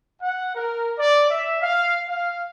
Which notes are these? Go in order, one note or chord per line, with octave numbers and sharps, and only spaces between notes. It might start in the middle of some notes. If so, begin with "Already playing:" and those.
F#5
A#4
D5
E5
F5
F5